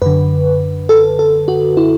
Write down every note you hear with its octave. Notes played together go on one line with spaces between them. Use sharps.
F#2 D3 B4
A4
A4
F#4
E4